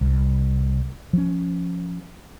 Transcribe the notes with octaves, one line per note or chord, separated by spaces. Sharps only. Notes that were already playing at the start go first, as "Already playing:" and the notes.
C2
F3 C#4